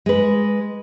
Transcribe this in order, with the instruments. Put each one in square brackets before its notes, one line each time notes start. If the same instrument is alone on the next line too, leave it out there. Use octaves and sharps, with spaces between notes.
[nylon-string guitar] G#3 B4